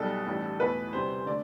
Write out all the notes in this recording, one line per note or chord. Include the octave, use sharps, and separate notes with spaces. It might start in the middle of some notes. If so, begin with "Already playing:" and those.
Already playing: B1 B2 G3 A4
A1 A2 G3
E2 B2 A3 B4
D2 C3 G3 C5
D3 A3 D5